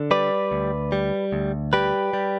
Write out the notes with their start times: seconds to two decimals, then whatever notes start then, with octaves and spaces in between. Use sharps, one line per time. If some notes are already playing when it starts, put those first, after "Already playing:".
Already playing: D3
0.11 G3 B4 D5
0.52 D2
0.92 G3
1.32 D2
1.73 G3 G4 B4
2.13 G3